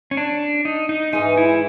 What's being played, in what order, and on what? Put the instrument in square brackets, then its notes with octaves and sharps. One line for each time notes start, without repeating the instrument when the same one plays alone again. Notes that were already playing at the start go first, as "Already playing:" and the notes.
[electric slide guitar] C#4
D4
D#4
D#4
[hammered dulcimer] G#2 E3 G#3 [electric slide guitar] D#4
[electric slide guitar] E4